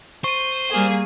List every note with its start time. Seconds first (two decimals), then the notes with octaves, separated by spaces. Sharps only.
0.24 C5 C#6 D#7
0.71 G3 A#3 G#4